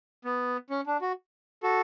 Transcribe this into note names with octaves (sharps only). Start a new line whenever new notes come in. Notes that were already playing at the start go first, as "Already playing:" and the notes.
B3
C#4
D4
F#4
F#4 A4